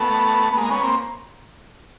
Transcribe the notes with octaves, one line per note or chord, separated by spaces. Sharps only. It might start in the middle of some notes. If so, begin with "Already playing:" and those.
Already playing: A3 B3
B3
G#3 A#3
B3 C#4
A#3 C4